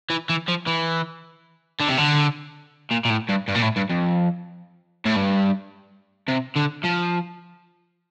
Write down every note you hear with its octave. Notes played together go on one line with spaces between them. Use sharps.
E3
E3
F3
E3
D3
C3
D3
A#2
A#2
A2
G2
G2
A#2
A2
G2
F2
A2
G2
C3
D3
F3